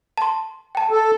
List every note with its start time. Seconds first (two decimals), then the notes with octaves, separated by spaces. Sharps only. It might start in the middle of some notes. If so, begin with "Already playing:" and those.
0.18 A5 C6
0.75 G5 A5
0.91 A4